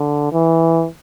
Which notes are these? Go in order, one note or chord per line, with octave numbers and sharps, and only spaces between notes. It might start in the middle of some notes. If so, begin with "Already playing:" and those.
Already playing: D3
E3